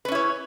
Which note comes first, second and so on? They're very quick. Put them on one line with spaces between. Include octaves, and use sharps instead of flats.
B4 C#4 E4 C#5